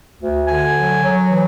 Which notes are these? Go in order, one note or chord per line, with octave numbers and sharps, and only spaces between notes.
D2
D3 G#5
F#3
F#3
E3